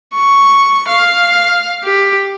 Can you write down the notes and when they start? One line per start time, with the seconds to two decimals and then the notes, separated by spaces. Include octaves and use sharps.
0.14 C#6
0.88 F5
1.84 G4